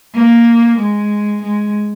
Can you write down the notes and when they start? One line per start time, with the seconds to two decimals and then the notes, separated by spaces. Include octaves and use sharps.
0.14 A#3
0.78 G#3
1.42 G#3